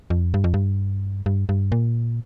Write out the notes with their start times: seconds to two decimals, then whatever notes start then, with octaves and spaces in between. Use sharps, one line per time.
0.10 F2
0.34 G2
0.44 F2
0.54 G2
1.26 G2
1.49 G2
1.72 A#2